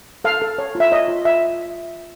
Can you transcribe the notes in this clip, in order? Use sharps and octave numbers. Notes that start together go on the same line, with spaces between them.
A4 F5
A4
C#5
F4
E5
C#5 D#5
F4
F4 E5